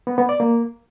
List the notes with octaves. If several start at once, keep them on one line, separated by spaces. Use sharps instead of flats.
B3
B3
D5
A#3